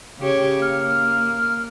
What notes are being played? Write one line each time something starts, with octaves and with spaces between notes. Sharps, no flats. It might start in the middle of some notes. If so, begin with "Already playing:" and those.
C#3 G4 C#5
A#3 F6